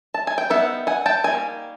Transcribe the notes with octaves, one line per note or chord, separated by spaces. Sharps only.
A5
G#5
G5
G3 B3 D#4 E5 F#5
F#5 G#5
G5 A5
D#3 G3 A#3 G#5